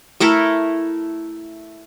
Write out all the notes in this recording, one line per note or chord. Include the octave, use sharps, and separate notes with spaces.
A3 E4 A4 A#4